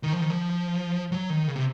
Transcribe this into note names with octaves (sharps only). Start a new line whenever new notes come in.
D#3
F3
D#3
F3
F#3
D#3
C#3
C3